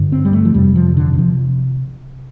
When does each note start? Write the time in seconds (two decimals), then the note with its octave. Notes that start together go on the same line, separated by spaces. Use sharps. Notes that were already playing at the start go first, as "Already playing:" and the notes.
Already playing: G2 D3
0.12 C4
0.25 G3
0.33 A3
0.45 F3
0.54 F2 C3 G3
0.76 F3
0.97 D3
1.13 D3
1.18 C3 F3